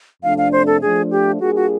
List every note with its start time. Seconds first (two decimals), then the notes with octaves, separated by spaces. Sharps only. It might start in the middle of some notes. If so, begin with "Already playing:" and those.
0.23 F2 C3 F3 A3 D4 F5
0.38 F5
0.52 C5
0.67 A4
0.82 F3 A3 D4 G#4
1.11 G4
1.40 G3 A#3 D4 F4 F#4 G#4
1.56 F#4